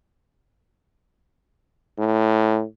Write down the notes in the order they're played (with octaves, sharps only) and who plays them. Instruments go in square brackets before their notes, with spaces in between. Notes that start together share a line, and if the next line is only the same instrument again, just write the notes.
[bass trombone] A2